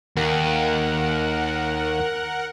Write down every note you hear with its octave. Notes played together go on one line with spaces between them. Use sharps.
D#2 A#4 F#5